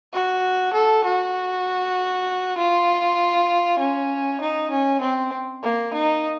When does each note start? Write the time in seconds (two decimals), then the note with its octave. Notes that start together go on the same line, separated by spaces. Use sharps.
0.13 F#4
0.73 A4
1.05 F#4
2.58 F4
3.79 C#4
4.41 D#4
4.71 C#4
5.01 C4
5.63 A#3
5.94 D#4